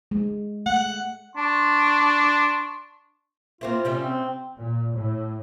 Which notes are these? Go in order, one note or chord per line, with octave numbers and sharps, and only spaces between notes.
G#3
A3 F#5
D4 A5 C6 C#6
A#3 C4 E4 F4
C3 G3 C#4
C4
A#2
A2